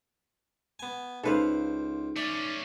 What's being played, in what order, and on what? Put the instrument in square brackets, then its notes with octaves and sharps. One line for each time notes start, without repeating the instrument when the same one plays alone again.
[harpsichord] B3 G#5
[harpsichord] C#2 C5 [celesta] D#4 [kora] A4 B4 F5
[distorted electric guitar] A3 C#4 [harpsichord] D5